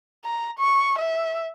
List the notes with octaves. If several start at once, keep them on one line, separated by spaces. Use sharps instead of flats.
A#5
C#6
E5